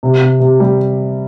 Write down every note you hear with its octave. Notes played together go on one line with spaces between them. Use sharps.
C3
C3
C3
G3